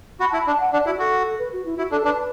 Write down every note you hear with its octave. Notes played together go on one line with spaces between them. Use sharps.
F#4 B5
E4 A5
B5
D4
A5
F#5
D4 D5
E4 F#4
F#4 A4
B4
F#4
E4
E4 F#4
D4 A4
D4 B4